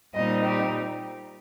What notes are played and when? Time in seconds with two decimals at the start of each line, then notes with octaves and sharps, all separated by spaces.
0.14 A#2 G3 C4 D#4 D#5
0.44 G4